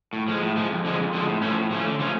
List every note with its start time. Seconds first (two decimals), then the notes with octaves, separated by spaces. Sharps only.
0.13 A2
0.28 F3 G#3
0.42 A2
0.56 F3 G#3
0.70 F2
0.85 D3 F3 G#3
0.99 F2
1.13 D3 F3 G#3
1.27 A2
1.42 F3 A3 C#4
1.57 A2
1.71 F3 A3 C#4
1.85 D3
2.00 F3 A3 C#4